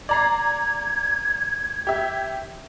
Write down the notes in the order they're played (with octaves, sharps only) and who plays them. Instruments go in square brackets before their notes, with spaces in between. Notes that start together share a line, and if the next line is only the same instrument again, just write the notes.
[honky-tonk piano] D5 A#5 C7 [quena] G#6
[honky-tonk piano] G4 E5